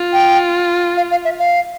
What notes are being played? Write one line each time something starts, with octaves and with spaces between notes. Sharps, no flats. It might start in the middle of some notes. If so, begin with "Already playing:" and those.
Already playing: F4
G5
F5
F5
E5
F5